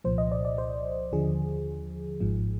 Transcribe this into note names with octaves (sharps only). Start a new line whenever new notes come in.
C2 A#2 F3 C5
D#5
D5
D5
C5
D#2 D3 F3 G#4
G#1 G#2 F3